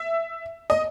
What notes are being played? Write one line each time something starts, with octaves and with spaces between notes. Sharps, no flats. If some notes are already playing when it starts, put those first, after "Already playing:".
Already playing: E5
D#5